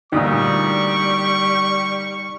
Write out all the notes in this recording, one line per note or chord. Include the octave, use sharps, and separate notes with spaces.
D2 A#2 G3 D#4 C#6 D#6